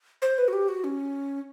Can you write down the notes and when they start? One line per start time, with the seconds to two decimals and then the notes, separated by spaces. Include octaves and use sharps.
0.22 C5
0.38 B4
0.48 F#4
0.53 G4
0.68 F#4
0.84 C#4